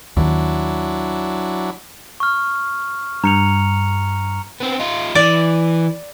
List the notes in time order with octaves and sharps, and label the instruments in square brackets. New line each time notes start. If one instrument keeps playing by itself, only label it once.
[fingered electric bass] D#2 D#3 [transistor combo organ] F#3 D4 E4
[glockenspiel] C#6 F6
[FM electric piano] G2 [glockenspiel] A#5 C#7 F7
[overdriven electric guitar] B3 C4
D#4 F4
[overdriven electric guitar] E3 [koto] D5